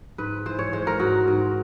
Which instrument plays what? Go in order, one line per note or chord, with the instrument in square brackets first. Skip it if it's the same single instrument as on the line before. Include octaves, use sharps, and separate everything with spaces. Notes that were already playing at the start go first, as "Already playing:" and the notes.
[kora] G#2 B4
E3 C5
C#5
G#3 C5
A#4
G#2 F#4
G#2